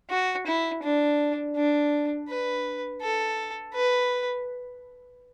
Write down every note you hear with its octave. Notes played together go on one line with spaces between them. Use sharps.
F#4
E4
D4
D4
B4
A4
B4